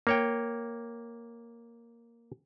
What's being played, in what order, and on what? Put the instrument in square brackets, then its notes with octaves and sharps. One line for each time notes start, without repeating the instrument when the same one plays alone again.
[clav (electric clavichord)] A#3 C#5 G5